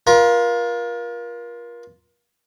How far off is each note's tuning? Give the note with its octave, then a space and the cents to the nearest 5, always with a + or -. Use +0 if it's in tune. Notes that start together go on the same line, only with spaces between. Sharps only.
F4 +0 A#4 +35